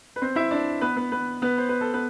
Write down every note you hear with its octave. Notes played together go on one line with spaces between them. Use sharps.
B4
C4 C5
E4 E5
D4 D5
B3 B4
B3 B4
B3 B4
B3 B4
C5
B4
A4
B3 B4